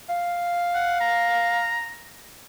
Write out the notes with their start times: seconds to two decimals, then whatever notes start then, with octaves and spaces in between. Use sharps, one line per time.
0.09 F5
0.75 F#5
1.01 A#5